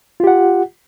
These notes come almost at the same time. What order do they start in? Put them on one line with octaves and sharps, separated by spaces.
F4 G4 F#5